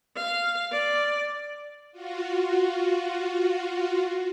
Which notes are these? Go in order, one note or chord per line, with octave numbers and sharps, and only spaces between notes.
F5
D5
F4 F#4